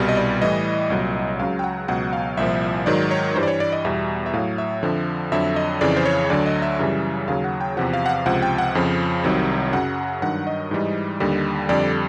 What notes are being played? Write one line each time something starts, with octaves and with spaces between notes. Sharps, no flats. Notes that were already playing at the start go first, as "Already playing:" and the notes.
Already playing: C2 B2 G3
D#5
D5
A2 E3 G3 D#5
C2 A#2 F#3
C#2 C#3 F#3 F5
G5
F#5
C#2 B2 F#3 F#5
F5
C2 A#2 F3 E5
G#2 D#3 F#3 D5
C#5
G2 E3 G3 C5
D5
C#5
D5
D#5
E2 B2 G3 E5
E5
A2 F#3 F5
E5
F2 D3 F3
F2 D3 F#3 E5
D#5
F2 C#3 E3 D5
C5
C#5
D2 D3 F#3 D5
D#5
E5
F#2 C#3 E3 G3
D#2 C#3 F#3 F5
F#5
G5
E2 C3 F3 F#5
F5
F#5
F5
C#2 C3 F3 F#5
G5
F#5
F2 C#3 F3
C2 C3 D#3 F#3
F#2 C#3 F#3 F#5
G2 D#3 F#3 F#5
D#5
G#2 E3 G3
D#2 D3 G3
F2 D3 G3 D5